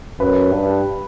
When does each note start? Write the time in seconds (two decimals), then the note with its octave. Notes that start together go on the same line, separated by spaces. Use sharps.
0.20 F#2 B4
0.52 G2